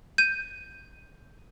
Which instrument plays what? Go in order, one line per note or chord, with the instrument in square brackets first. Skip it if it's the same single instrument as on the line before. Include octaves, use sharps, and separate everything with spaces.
[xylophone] G6 D#7